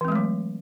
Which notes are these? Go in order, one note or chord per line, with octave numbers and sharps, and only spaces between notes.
E3 F#3 G#3 A3 C4